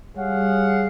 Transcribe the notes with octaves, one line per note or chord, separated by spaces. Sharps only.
G3 G#4 C#5 F5 F#5